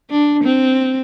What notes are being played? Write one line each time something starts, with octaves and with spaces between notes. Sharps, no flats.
D4
C4